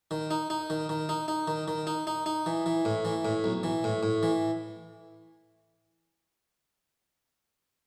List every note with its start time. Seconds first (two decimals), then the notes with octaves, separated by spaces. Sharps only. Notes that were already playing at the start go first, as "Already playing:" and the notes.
0.11 D#3
0.31 D#4
0.50 D#4
0.70 D#3
0.89 D#3
1.09 D#4
1.28 D#4
1.47 D#3
1.68 D#3
1.87 D#4
2.07 D#4
2.26 D#4
2.46 E3
2.66 E3
2.85 A2
3.05 E3
3.25 A2
3.44 B1
3.63 E3
3.84 A2
4.03 A2
4.23 E3